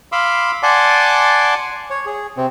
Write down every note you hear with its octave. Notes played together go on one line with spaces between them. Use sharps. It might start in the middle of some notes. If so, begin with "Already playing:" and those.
F5 B5 C6 D6 E6
D5 F#5 G#5 A5 C6 D6
C#5
G#4
C3 C4